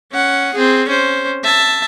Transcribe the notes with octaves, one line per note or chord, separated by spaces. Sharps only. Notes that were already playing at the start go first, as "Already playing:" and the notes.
C#4 F#5
C4 G#4
C#4 C5
E5 A5